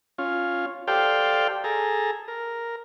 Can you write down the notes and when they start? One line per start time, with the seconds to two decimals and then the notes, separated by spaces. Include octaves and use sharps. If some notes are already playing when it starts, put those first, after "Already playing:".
0.18 C#4 F4
0.88 G4 A4 C5 D5 F5 G5
1.64 G#4 A4 A#5
2.28 A#4